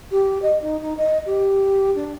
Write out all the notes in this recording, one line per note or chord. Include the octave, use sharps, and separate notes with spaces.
G4
D#5
D#4
D#4
D#5
G4
D4